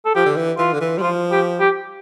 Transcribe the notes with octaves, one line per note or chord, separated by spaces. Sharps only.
A4
F3 G4
D3
E3
E3 F4
D3
E3
G3
F3 F4
G4
G4